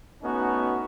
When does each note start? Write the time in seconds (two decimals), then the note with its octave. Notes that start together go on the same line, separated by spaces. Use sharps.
0.23 A3 B3 C#4 D#4 F#4